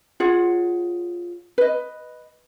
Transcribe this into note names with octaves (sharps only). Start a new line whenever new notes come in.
F4 G#4 C#5 F#5
B4 D#5